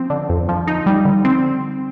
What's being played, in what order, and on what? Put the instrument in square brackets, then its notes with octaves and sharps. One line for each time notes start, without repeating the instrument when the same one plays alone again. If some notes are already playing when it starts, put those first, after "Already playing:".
Already playing: [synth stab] F3 C4
D3
F2
F3
D#4
G3
D3
C4